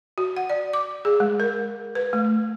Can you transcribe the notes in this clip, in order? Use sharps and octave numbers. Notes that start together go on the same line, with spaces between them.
F#4
F#5
D5
D6
G#4
G#3
A#4
B4
A3